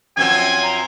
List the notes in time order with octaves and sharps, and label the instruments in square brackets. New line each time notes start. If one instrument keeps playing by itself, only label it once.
[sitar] F#2 F3 C4 [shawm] G#5 [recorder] G#6
[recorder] A#5